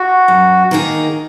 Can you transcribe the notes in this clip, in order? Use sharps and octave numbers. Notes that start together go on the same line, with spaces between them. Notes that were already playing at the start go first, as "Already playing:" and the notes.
Already playing: F#4
F#2
D#3 A#3 D#4 G#4